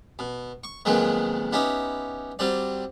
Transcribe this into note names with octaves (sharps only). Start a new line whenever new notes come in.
B2
C#6
F2 A#2 D#3 F#3 G#3 B3
B3 C#4 D#4 E4 G4
F#3 G3 C4 D5